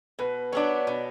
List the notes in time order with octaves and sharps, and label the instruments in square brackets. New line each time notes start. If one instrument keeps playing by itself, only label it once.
[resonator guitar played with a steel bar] B2 [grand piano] B4
[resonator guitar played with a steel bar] F#3 B3 D4 [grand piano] C#5
[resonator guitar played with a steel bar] B2